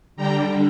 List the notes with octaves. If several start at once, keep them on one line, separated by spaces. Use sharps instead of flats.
D3 G3 D4 G5 A#5